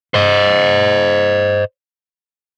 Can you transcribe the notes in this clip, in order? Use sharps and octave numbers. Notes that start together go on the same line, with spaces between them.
C5 D#5